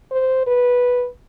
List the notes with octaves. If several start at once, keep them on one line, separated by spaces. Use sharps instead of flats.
C5
B4